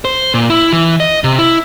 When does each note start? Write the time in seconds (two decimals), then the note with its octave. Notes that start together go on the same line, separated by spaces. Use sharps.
0.05 C5
0.34 A#2
0.50 E4
0.73 E3
1.00 D#5
1.24 C3
1.39 E4